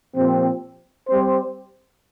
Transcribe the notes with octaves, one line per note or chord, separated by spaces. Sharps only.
A#2 F3 C4 G4
G3 C4 G4 C5